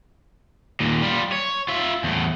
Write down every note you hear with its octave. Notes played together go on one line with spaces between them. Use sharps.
D#2 A#2
G3 F4
C#5
F4 E5
E2 A2